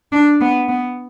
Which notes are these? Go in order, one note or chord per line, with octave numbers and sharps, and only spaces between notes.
D4
B3
B3